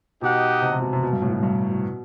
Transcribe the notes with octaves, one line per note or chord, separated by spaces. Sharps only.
B2 D#4 G4 D#5 F#5
C3
C3
B2
C3
B2
G2
A2
B2
G2
B2